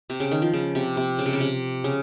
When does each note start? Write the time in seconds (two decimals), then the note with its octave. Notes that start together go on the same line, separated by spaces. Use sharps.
0.10 C3
0.20 C#3
0.31 D#3
0.42 F3
0.54 C#3
0.75 C3
0.97 C3
1.19 C#3
1.26 C3
1.33 C#3
1.40 C3
1.84 C#3